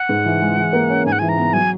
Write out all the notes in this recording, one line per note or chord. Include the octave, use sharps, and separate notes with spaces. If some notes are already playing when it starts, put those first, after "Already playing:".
Already playing: F#5
G#2
E3
G#3
E3
A#3
C#4
G#2 G#5
F#5
E3 G#5
A#5
B3
F#3 G#5